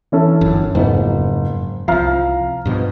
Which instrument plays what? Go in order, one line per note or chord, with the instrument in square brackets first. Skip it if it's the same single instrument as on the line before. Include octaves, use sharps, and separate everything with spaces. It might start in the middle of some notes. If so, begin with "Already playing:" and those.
[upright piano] E3 C#4 A4
[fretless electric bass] G1 F#2
[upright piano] F#1 [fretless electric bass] F2 G#2 B3
[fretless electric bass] C2 F3 [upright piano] F5 A#5 F6
[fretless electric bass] G2 B2 F3